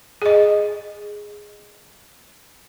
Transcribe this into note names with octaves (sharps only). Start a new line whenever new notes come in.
G#4 D#5